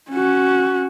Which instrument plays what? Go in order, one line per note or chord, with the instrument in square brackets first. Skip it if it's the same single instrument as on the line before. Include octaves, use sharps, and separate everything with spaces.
[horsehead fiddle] C#4 F#4